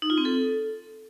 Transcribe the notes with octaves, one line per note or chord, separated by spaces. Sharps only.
D#4
F4
C4
A4